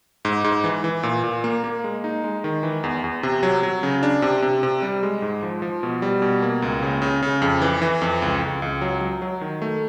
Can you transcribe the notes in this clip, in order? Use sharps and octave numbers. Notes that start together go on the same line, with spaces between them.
G#2
G#2
E3
E3
A#2
A#2
A#3
A#3
G#3
D#4
G#3
D#3
E3
E2
E2
C3
F#3
F#3
C#3
D4
C3
C3
C3
G3
G#3
G#2
F3
F3
B2
G3
B2
A#3
C#2
C#3
C#3
C#3
F2
E3
E3
F2
C#2
C#2
C#2
F#3
F#3
F#3
D#3
A3